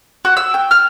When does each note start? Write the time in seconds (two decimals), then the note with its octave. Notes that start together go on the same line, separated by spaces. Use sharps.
0.25 F#4
0.37 E6
0.54 G5
0.71 F6